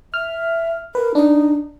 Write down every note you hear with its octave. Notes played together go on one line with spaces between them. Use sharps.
E5 F6
A#4 B4
D4 D#4